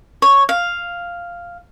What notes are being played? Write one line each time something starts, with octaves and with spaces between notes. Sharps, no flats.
C#5
F5